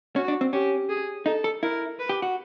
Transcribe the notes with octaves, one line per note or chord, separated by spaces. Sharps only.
C#4 F#4
D4
C4
C#4 G4
G#4
D#4 A4
A4
E4 A#4
B4
G4
F#4